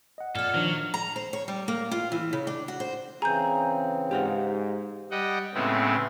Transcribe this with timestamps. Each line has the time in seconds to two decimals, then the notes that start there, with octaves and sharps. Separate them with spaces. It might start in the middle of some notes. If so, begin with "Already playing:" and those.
0.18 D#5 F#5
0.35 A#2 B3 A4 F6
0.54 D#3 F3 F#3 D4
0.94 A#5
1.16 C5
1.33 C#5
1.48 G3
1.68 A#3
1.91 F4
2.12 E3
2.33 C#3
2.47 D4
2.68 F#4
2.80 C5
3.22 C#3 E3 C4 G#4 A#5 G6
4.11 G#2 G4 F5 F#5
5.11 G3 D#5 F#5 G5
5.54 A2 C#3 G#3 B3 C4 E4